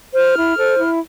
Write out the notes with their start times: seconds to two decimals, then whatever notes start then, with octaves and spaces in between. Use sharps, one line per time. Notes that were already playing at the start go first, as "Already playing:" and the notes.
0.14 C5 F6
0.36 E4
0.57 A4 C5
0.78 E4